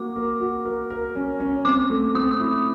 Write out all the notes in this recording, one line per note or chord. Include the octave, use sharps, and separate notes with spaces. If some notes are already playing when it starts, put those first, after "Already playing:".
Already playing: A#3 F#4 D6
A#4
F#4
A#4
A#4
C#4
C#4
C4 D6
A3
C4 D#6
D#6
E4